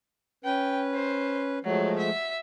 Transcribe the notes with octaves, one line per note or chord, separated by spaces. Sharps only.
C#4 B4 G5
C5
F3 F#3 G#3 A3
E5